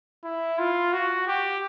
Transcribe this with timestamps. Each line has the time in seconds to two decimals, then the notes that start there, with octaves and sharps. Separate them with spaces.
0.24 E4
0.59 F4
0.93 F#4
1.28 G4